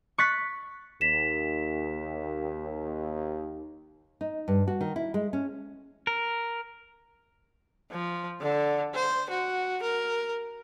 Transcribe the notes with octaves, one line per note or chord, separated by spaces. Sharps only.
C#6 F#6 A6 B6
D#2 B6 E7
D#4
G2
F#4
D#3
E4
G#3
C#4
A#4
F3
D3
C5
F#4
A#4